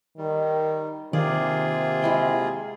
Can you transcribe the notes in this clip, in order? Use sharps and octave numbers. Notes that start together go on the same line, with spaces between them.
D#3 G3
C3 D#3 A#3 F4 G#4 D5
G#3 E4 G5